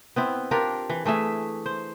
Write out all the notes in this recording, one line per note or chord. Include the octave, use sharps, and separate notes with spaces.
B3 C4 E4
D4 F4 G4 A#4
E3
E3 A3 G#4 E5
C5